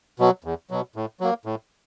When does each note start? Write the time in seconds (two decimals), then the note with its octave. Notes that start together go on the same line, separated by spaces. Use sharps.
0.19 B2 F#3
0.44 E2
0.70 B2 F#3
0.96 A2
1.20 F#3 A#3
1.45 A2